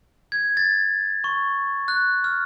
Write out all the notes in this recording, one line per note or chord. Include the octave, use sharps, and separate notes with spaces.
G#6
A6
C#6
F#6
F6